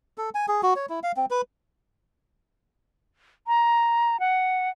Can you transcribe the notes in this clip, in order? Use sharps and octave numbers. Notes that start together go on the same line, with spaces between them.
A4
G#5
G#4
F#4
C#5
E4
F5
C4
B4
A#5
F#5